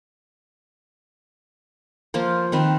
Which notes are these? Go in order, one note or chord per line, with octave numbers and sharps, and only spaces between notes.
F3 A#3 F4 C5
D#3 C4 B4